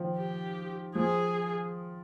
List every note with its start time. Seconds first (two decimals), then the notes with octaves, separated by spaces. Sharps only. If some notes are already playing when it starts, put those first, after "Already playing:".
Already playing: D#3 F3
0.17 G4
0.95 F3 G#4